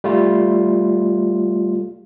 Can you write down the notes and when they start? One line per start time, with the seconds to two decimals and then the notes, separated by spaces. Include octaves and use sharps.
0.04 G3 A3 F4